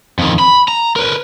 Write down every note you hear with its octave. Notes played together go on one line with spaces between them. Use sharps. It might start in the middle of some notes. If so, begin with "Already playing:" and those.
F2 D#3
B5
A#5
A#4 B4